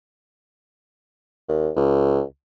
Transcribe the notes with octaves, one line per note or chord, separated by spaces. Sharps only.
D#2
C#2